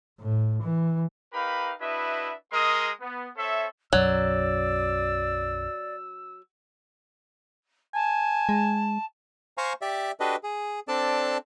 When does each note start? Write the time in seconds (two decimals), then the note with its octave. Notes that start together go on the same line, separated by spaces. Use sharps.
0.20 A2
0.63 E3
1.32 D#4 G4 A#4 B4 F5 B5
1.80 D4 E4 F#4 B4 D#5 E5
2.52 G#3 A#4 D#5 C6 D#6
3.00 B3
3.36 C4 A4 C#5 E5
3.93 B1 F#2 F#3 D5 E6
7.94 G#5 A5
8.49 G#3
9.58 C5 F5 G#5 A#5 C#6
9.82 G4 D5 E5
10.20 D4 F#4 G4 A4 B4 D#5
10.43 G#4
10.88 C4 D4 A4 D5 A5